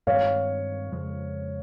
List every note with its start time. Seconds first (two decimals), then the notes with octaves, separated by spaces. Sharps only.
0.07 G2 D#3 G#3 C4 C#5 F5
0.92 F2 C#3 F3 G#3